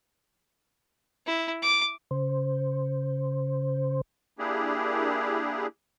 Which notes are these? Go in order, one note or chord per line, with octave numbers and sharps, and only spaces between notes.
E4
D6
C#3 C5
A#3 D4 E4 G4 G#4